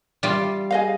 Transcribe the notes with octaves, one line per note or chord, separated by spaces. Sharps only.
G3 F4
G#4 D#5 F5